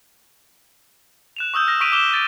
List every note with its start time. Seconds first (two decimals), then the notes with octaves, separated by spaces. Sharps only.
1.37 F#6 E7 F7
1.54 C#6 D#6 E6 G6
1.67 F6 A#6
1.81 C#6 B6 D7 D#7 F7
1.92 D6 E6 E7 G7
2.13 A6 D7